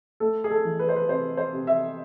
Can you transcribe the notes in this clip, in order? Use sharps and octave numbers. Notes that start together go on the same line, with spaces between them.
A3 A4
G#4
A4
E3
B4
C5
B4
C3 C5
C5
C3
E5